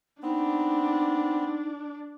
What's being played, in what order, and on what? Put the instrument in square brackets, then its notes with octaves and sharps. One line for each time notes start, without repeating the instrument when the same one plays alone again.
[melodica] B3 C4 [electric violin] D4 [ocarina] D#4